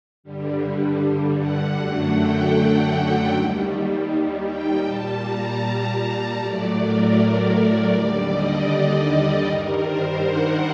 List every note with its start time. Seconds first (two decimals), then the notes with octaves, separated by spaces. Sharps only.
0.23 G2 D3 G3
1.38 F#5
1.76 F#2 D3 F#3 A3 F#5
2.16 G5
3.31 D#2 D#3 G3
4.46 G5
4.84 A#2 G3 A5
5.22 A#5
6.37 A2 F#3 A3 D5
6.76 A#4
7.14 D5
7.91 D#2 D3 G3 D5
8.29 D#5
9.45 G2 D#3 G3 A#4
9.83 C5
10.21 F#5